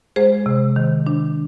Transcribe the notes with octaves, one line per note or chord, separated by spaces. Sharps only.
G#3 G#4 C5
C3
D#3
D4